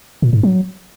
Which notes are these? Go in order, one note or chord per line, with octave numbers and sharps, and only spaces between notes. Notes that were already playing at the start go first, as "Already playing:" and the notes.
A#2
G#2
F#3